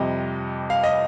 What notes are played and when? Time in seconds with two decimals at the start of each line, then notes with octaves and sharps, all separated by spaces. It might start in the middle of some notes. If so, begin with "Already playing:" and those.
Already playing: F2 C3 G3 D#5
0.70 F5
0.84 D#5